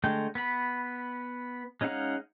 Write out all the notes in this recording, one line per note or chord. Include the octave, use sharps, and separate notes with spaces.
D3 G#3 A3 G5
B3 B5
G#3 C#4 D#4 F5 F#5